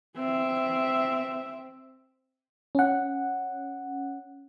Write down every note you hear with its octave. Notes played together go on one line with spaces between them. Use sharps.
C4 E5
C#4 F#5